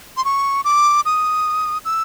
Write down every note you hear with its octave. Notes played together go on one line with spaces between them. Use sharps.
C6
C#6
D6
D#6
E6